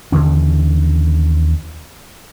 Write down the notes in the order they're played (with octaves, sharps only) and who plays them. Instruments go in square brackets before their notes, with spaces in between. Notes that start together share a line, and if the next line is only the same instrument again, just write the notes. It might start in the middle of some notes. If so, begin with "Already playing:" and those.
[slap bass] D#2 D3 E3 C#4